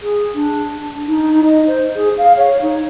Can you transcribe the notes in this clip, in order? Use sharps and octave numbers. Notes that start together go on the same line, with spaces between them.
G#4
D4
D#4
D#5
C5
G#4
F5
C#5
D#4